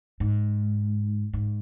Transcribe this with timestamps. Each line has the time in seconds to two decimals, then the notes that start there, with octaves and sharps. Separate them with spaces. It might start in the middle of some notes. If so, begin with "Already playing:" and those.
0.20 G#2
1.33 G#2